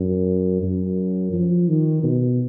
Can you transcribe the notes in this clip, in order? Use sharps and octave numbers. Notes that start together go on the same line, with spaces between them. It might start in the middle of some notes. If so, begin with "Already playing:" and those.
Already playing: F#2
F#2
F3
D#3
B2